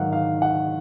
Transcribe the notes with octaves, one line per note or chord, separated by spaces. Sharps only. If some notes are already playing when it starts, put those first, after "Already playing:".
Already playing: G#2 D#3 F#3 F5 F#5
F5
F#5